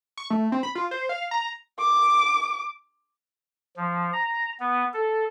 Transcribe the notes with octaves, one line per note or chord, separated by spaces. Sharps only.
C#6
A3
C4
B5
F4
C5
F5
A#5
D6
F3
A#5
B3
A4